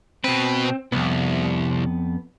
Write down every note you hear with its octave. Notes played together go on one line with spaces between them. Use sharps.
B2 C4 B4
C2 F2 B3